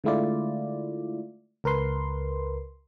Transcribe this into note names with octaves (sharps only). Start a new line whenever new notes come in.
D3 G#3 A3 E4 F4 D5
C#2 A#4 B4 C6